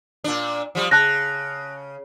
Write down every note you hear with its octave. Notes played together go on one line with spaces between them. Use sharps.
A#2 D4
F3 G3
C#3 A5 F#6 A#6